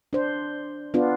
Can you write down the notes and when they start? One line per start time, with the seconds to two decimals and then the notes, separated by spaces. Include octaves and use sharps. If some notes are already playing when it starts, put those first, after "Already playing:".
0.13 D4 C5
0.94 B3 D4 F4